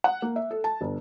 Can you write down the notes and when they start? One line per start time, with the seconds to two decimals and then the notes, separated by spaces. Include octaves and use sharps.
0.04 F#5
0.22 A#3
0.36 E5
0.51 A4
0.64 A5
0.81 G1